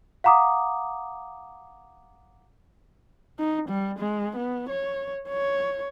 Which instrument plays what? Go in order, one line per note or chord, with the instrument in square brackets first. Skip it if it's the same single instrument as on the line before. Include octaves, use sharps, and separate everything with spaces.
[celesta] F5 F#5 A#5 D6 D#6
[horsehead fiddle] D#4
G3
G#3
B3
C#5
C#5